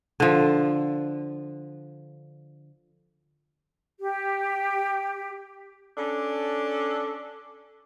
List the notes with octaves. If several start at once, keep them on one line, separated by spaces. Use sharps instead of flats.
D3 F3
G4
C#4 D4 A4